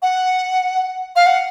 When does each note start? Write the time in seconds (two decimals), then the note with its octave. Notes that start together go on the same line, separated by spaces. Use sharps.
0.02 F#5
1.16 F5
1.27 F#5